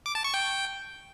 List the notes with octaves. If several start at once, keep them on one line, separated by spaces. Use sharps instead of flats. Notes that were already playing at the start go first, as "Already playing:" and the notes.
D6
A5
C#6
G5